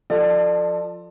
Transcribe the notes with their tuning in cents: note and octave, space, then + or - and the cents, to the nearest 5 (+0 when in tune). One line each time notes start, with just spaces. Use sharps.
F3 +5 A4 +15 D5 +35